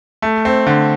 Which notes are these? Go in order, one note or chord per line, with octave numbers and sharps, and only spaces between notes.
A3
C4
D3